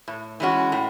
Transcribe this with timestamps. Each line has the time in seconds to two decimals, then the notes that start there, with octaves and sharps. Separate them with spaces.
0.08 A2
0.40 E3 G#3 C#4 F#4
0.72 A2